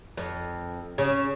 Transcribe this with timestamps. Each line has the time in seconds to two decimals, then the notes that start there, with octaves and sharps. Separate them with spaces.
0.17 F2
0.98 C#3